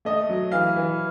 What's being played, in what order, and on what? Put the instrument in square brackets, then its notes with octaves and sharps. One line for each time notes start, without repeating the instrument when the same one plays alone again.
[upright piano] A3 D#5
F#3
E3 F5
E3